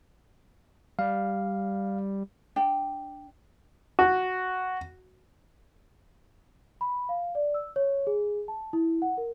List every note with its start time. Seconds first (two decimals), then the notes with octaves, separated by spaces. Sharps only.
0.99 G3 F5
2.56 D4 G5
3.99 F#4
6.81 B5
7.09 F5
7.35 D5
7.54 E6
7.76 C#5
8.07 G#4
8.48 A5
8.73 E4
9.02 F#5
9.18 A#4